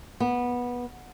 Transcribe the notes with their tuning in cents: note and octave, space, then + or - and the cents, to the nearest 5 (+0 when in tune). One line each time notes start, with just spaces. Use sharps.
B3 -15